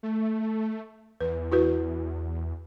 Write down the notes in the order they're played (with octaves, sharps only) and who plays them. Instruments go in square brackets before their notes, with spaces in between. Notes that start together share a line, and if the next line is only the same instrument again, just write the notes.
[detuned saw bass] A3
[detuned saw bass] E2 [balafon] B4
[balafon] E4 F#4 B4